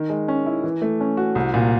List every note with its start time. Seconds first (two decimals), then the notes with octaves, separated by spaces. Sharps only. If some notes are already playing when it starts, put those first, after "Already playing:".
Already playing: D#3
0.10 G#3
0.28 C#4
0.46 E4
0.64 E3
0.82 A3
1.01 C#4
1.17 F#4
1.35 C2
1.54 A#2